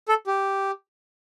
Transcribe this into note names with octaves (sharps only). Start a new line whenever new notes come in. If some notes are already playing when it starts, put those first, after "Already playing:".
A4
G4